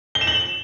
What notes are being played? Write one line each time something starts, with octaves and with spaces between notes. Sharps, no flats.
G7
E7
F#7